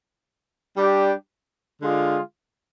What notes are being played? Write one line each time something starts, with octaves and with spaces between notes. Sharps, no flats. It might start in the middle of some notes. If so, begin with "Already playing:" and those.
G3 D4 G4
D3 G#3 D4 F4 G#4